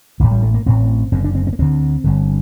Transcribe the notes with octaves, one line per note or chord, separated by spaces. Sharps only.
A1 A2 D#3
G3
A3
A#3
A1 A2 C4
F#1 F#2 D3 C4
D4
C4
C4
A#3
D2 D3 C4
G1 G2 D3